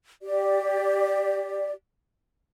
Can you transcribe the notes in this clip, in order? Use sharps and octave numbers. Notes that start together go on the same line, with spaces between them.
G4 D5